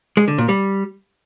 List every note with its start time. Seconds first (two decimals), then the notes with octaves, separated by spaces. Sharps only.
0.17 G#3
0.28 D3
0.38 A#2
0.49 G3